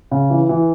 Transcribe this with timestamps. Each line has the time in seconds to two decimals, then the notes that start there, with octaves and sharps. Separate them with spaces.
0.11 C#3
0.30 E3
0.49 E3